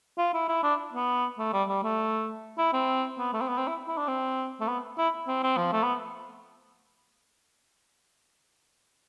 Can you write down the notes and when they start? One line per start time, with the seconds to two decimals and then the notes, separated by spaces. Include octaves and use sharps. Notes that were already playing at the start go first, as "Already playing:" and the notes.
0.18 F4
0.34 E4
0.49 E4
0.64 D4
0.94 B3
1.38 A3
1.53 G3
1.69 G3
1.83 A3
2.58 E4
2.73 C4
3.19 B3
3.33 A3
3.41 C4
3.48 B3
3.58 C4
3.68 E4
3.88 E4
3.98 D4
4.08 C4
4.61 A3
4.68 B3
4.98 E4
5.28 C4
5.43 C4
5.57 F3
5.73 A3
5.83 B3